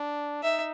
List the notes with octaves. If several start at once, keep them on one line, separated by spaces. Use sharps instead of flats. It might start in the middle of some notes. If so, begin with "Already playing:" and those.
Already playing: D4
D#4 E5